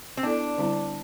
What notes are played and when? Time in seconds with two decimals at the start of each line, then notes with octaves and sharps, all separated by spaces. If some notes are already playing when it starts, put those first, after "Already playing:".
0.17 C4
0.23 B3 D4 E4 A4 D5
0.58 D3 G3 C4 E4